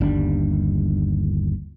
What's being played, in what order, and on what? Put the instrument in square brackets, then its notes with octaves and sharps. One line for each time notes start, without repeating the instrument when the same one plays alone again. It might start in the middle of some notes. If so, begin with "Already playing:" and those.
[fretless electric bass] G1 D#2 G3 D4